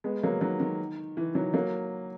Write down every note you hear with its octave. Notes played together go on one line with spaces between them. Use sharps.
G#3 B3
F#3 A#3
D#3 F#3
D#3
E3
D#3 F#3
F#3 A#3